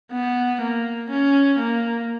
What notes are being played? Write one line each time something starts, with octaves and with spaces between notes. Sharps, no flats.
B3
A#3
C#4
A#3